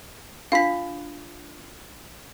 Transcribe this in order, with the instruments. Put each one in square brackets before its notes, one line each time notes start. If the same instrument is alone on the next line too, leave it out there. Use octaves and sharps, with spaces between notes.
[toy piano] D4 F4 [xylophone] F5 B6